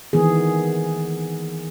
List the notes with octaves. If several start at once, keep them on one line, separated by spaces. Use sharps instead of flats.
D#3 E3 B3 G#4